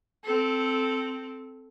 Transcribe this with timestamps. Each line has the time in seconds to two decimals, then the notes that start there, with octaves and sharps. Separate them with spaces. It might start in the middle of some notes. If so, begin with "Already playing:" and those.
0.24 C4 A4